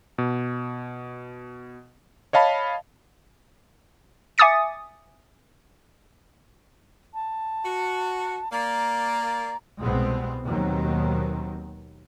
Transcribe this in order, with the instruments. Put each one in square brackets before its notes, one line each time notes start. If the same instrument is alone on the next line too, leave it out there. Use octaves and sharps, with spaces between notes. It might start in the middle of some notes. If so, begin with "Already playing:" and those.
[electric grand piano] B2
C#5 D#5 F5 A5 B5
[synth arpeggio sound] E5 G#5 D6 D#6 A6 C#7
[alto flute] A5
[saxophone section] F#4
[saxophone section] A#3 D5 [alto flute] A#5
[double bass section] C2 B2 G#3 B3 C4
D#2 B2 D#3 F#3 C4